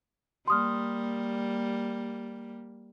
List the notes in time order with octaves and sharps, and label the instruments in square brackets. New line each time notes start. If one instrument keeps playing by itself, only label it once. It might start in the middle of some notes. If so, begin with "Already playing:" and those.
[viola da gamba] G3 A#3 [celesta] C6 D#6 F6